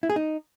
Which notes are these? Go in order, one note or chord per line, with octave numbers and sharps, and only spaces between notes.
E4
G#4
D#4